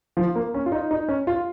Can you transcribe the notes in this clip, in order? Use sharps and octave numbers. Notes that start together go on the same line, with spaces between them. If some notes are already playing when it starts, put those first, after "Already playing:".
F3
A#3
C#4
F4
D#4
D#4
C#4
F4